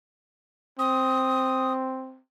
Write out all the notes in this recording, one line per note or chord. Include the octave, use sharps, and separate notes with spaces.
C4 D#6